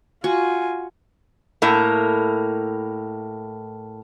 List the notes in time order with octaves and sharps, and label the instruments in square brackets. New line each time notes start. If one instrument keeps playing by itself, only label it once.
[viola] F4 G#5 [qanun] F#4
[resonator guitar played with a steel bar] A2 A#3